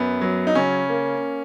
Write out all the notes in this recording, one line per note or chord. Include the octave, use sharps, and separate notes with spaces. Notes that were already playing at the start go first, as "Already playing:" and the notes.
Already playing: F#2 B3
F#3
D#4
C#3 C#4
A#3